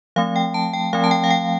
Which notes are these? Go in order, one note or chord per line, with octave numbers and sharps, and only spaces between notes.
F3 A3 C4 F5
G5
A5
G5
F3 A3 C4 F5
A5
G5
F5
G5